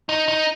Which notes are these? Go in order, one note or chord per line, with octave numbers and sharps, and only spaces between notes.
D#4
D#4